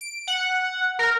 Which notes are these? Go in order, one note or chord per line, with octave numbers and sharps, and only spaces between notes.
D7
F#5
A#4